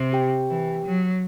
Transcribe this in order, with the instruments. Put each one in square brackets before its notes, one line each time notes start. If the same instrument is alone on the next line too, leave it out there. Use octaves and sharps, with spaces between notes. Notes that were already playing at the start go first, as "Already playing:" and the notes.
Already playing: [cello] C3
[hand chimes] G4 G5
[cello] E3
F#3